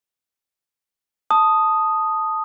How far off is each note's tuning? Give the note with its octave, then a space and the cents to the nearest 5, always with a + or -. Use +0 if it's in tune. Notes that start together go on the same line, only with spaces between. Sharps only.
A5 +0 D#6 +0